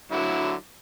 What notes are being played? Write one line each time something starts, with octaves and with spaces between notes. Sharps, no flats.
D3 F#3 E4